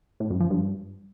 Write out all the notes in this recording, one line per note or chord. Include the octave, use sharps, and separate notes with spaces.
A2
F#2
F3
G2